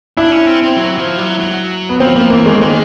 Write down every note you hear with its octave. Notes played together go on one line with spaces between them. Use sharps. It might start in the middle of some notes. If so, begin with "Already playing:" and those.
D4 E4
C#4
C4
C4
F#3
F3
F#3
F#3
B3
F3 C4
F3 A#3
E3 A#3
D#3 G#3
D#3 G#3